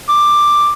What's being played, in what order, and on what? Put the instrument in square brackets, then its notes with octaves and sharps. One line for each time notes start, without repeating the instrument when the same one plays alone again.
[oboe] D6